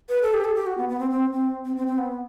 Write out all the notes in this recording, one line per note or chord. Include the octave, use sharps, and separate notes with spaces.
B4
A4
G4
A4
G4
F#4
B3
B3
C4
C4
C4
C4
C4
C4
B3